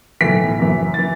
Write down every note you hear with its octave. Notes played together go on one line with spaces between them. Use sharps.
B1 A2 E3 B6
F#1 F#2 E3
E3 A6